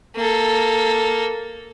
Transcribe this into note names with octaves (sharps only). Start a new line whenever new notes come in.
A#3 A4